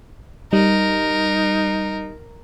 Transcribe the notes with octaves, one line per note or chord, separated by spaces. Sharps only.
G3 D#4 A#4